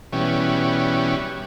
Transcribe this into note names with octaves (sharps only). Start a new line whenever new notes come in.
B2 E3 G3 C#4